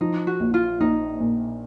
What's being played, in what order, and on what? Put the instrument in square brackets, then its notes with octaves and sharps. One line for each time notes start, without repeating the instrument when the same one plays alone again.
[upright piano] F3 [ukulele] D#4
[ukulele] F#4
[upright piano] A#1
[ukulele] F4
[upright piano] A#1 [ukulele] D#4
[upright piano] A#2